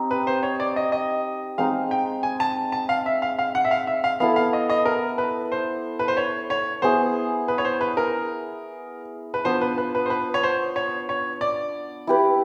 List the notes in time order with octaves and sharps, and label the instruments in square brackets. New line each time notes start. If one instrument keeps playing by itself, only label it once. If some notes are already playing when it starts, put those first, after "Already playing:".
Already playing: [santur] C4 D#4 G4
[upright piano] B4
C5
C#5
D5
D#5
D#5
[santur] G#3 C4 D#4 [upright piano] F5
[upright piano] G5
G#5
A5
A5
F5
E5
F5
F5
F#5
E5
F5
E5
F5
[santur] B3 E4 A4 [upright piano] F5
[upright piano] F5
D#5
D#5
A#4
B4
C5
B4
C5
C#5
C#5
[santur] B3 E4 G#4 [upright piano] C5
[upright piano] B4
C#5
C5
B4
A#4
B4
[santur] B3 D4 F4 [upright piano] C5
[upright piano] B4
B4
B4
C5
B4
C#5
C5
C#5
C#5
D5
[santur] E4 G4 B4